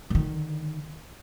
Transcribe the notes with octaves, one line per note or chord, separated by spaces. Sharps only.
D3 D#3